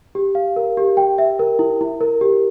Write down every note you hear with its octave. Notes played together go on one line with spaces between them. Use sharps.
G4
F5
A#4
G4
G5
E5
A#4
E4
E4
A#4
G4